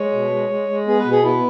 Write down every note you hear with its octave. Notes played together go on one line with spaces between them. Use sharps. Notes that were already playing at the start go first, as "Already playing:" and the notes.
Already playing: G#3 C#5
B2
G#3
G#3
G#3
B3 G#4
B4
B2
G#4
B3 E4